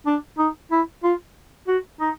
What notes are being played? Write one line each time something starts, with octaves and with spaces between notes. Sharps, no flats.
D4
D#4
E4
F4
F#4
D#4